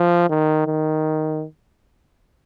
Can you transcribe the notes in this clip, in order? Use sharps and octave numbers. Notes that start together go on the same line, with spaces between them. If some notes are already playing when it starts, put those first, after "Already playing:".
Already playing: F3
D#3
D#3